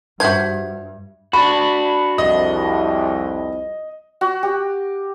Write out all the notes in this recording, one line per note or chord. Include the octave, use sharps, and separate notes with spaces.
G2 F3 F#4 E5 G6 G#6
D4 F#4 B5
C2 F2 D#5
F#4
G4